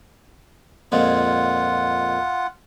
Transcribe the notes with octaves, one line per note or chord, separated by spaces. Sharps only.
F2 A#2 G#3 F4 F#5